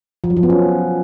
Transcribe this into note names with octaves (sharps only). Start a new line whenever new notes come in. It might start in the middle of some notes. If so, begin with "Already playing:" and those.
F3
F#3
F3
B3
C#4